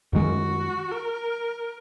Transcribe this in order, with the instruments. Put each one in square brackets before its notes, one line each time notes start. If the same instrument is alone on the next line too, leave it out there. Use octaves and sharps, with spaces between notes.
[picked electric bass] F#2 D#3 G#3 [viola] F#4
[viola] A#4